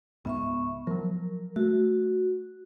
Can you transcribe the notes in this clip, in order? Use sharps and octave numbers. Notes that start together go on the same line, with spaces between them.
C#2 G#2 B3 E5 C#6
F3 F#3 A#4
A3 F#4